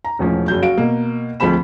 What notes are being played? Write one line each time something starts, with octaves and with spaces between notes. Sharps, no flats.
A#5
E1 A1 F3 C#4
F#1 F#3 G6
F#3 F#4 F5 D7
B2 A#3
D2 F3 G#3 C4 B5 E7